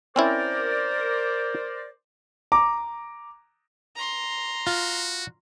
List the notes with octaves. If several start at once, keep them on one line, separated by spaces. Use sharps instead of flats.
C4 C#4 E4 A#4 C5 D5
A#5 D6
A#5 C6
F4 F#4